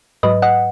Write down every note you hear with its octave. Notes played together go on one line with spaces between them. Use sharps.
G#2 F#3 B4 D#5
D#5 F#5